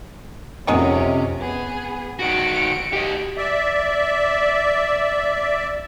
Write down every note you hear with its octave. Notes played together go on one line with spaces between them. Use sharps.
F2 C3 D#3 F#3 G#3 C#4
B3 G#4
D#3 F#4 C#7 D7
G4 D#5
D5 E5